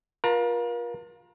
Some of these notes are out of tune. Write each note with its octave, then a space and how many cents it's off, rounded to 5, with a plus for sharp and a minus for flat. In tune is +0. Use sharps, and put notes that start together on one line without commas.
F4 +20 A#4 +40 A#5 -40